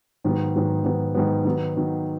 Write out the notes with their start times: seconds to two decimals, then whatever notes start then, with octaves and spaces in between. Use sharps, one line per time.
0.24 G#2 D#3 F#3 B3
0.55 G#2 D#3 F#3 B3
0.84 G#2 D#3 F#3 B3
1.14 G#2 D#3 F#3 B3
1.45 D#3 F#3 B3
1.76 D#3 F#3 B3